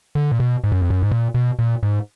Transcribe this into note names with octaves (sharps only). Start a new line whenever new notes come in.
D3
A#2
B2
G#2
F#2
F2
F#2
G#2
A#2
B2
A#2
G#2